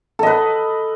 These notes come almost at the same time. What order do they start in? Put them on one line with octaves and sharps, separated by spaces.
A4 D#5 B4